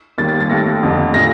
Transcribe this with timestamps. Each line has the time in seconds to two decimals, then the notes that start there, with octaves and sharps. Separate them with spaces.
0.18 D#2 D#3 G3 A#3 A6
0.29 A6
0.40 A6
0.49 D#2 D#3 A3 A#6
0.82 F1 F2 D3
1.14 A#2 A3 A#6